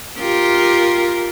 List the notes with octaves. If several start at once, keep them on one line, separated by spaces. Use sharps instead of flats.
F4 G4 A#4